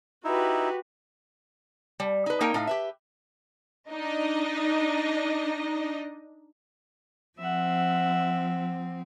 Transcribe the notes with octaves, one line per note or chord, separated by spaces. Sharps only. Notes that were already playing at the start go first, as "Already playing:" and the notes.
D#4 E4 F#4 G4 B4
G3
D#4 B4
A#3 D#4 A#4 G5
A2 D#4 F5
G4 B4 E5
D4 D#4 D#5
F3 C4 E5 F#5